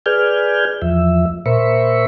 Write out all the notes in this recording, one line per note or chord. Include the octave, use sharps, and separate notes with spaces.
G#4 B4 D5 G#5 F6 G6
E2 F3 E5
A#2 A#4 C5 E5 B5 C#6